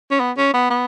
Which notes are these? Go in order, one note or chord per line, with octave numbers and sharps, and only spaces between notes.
C#4
B3
C#4
B3
B3